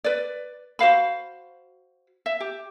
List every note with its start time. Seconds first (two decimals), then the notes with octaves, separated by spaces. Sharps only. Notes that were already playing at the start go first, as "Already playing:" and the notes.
0.04 B4 D5
0.79 F#4 C5 F5 B5
2.26 E5
2.40 G4